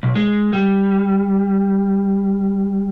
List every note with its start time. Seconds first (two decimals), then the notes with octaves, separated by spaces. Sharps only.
0.03 B1
0.15 G#3
0.53 G3